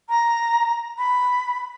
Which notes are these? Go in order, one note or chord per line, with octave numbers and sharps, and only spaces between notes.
A#5
B5